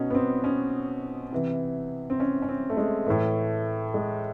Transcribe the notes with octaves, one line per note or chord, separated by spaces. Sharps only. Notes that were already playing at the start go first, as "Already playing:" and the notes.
Already playing: B2 C#4 D#4
B3
C4
C#4
C3 E3
C4
C#4
C#4
C4
A3
G#3
A2 E3 A3
G#3